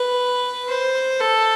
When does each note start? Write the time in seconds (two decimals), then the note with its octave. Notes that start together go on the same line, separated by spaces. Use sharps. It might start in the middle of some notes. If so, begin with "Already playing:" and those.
Already playing: B4
0.68 C5
1.20 A4